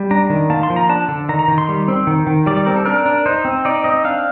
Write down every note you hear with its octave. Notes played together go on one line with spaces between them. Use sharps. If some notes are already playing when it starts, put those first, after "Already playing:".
Already playing: G3
D4 A#5
D#3
A#3 A5
C6
F3
A#5
D4 A5
D3
D#3 A#5
A#5
D#3
C6
G3
C4
D#3
D#3
G3 D5
D5
C4 A#4
A4
D4 A#4
D4
D#4 C5
C4
D#4 D5
C4 D#5
D4 F5